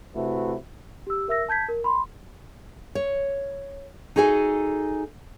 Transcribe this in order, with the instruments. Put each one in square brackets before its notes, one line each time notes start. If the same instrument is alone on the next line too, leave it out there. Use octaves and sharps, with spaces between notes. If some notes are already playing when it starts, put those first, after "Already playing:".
[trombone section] C3 A3 E4 F#4 B4
[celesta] G4 E6
A#4 E5 E6 A#6
A5 G6 G#6 B6
A#4
B5 C6
[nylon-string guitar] C#5
D#4 F#4 G#4 A4 G#5